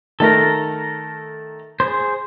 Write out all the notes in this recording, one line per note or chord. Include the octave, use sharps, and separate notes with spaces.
D#3 A3 A4 A#4 A#5
G#4 C5